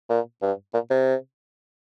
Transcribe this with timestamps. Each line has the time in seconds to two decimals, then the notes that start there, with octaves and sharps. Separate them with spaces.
0.10 A#2
0.42 G2
0.74 A#2
0.90 C3